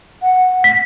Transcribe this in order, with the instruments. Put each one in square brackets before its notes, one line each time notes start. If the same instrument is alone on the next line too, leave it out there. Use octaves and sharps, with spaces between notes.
[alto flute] F#5
[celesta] B6